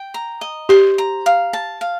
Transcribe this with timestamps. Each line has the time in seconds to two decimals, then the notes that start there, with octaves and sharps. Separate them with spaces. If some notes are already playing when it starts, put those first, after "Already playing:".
Already playing: G5
0.14 A#5
0.41 D#5
0.69 G4 C5
0.98 A#5
1.26 F5
1.53 A5
1.81 F5